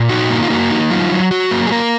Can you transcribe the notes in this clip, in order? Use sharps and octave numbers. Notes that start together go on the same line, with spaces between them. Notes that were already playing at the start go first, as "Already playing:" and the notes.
Already playing: A#2
D#4 F#4
A#3
F4
A#3 F#4
D#4
F#3 F4
F#3
F#3 F#4
A#3
G#4
A#3 A#4